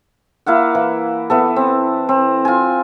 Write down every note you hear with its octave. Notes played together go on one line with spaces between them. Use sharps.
A#3 E4 F5 F#5
E3
E3 B3 A4
C4
C4
F4 G#5